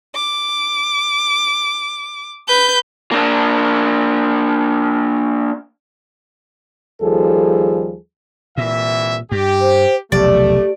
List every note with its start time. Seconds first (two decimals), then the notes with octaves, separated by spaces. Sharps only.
0.15 D6
2.48 B4 G6
3.12 A#3 D4
7.01 D#2 F3 G3 G#4 A4
8.58 C2 A#2 E3 E5
9.32 G2 G4
9.61 C5
10.12 F1 B1 E2 A3 G4 D5